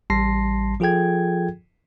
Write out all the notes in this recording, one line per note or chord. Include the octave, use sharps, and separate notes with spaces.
A1 G3 A5 C6 A#6 C7
F3 F4 G#4 A4 G5 G#6